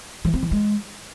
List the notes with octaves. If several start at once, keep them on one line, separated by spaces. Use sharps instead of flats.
E3
C4
E3
G#3